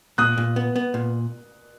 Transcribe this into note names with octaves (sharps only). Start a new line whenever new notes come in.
A#2 D#6 F#6
A#2
B3
B3
A#2